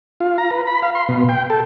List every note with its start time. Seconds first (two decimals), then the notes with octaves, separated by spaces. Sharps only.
0.20 F4
0.38 A#5
0.51 B4
0.67 B5
0.82 F5
0.95 C6
1.09 B2
1.29 G5
1.50 A4